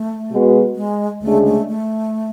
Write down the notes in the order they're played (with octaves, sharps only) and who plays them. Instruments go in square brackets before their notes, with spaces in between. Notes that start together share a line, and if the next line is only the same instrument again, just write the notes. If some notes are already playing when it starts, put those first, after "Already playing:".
Already playing: [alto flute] A3
[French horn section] B2 G#3 B3 F#4 B4
[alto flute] G#3
[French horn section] D2 C#3 G#3 D4 [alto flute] A3
[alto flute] A3
A3